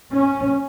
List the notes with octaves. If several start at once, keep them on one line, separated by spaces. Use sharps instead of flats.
C#4